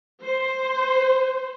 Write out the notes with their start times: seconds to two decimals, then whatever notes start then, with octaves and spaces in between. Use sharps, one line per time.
0.25 C5